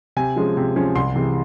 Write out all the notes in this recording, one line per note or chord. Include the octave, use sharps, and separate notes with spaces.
C3 G#5
F3 G#3 C#4
C3
F3 G#3 C#4
C2 C6
C3 E3 G#3